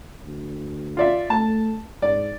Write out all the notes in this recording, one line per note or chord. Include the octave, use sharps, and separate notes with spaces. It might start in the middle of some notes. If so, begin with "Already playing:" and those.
D2
F4 D5 E5
A3 A5
G#2 D5